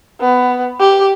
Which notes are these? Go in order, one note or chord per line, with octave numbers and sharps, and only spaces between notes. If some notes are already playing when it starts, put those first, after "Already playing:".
B3
G4